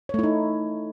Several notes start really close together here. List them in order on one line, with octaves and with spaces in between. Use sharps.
C#5 A3 E4 D#4